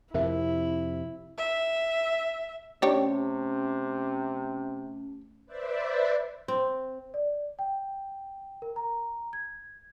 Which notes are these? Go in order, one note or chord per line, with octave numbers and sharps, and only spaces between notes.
F2 C3 E4 A#4 E5
E5
C3 A3 C#4 D4 G4 C#5
B4 C5 D5 E5
C4
D5
G5
A#4
A#5
G#6